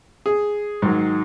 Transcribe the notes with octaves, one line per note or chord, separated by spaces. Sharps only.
G#4
G#2 D#3 F#3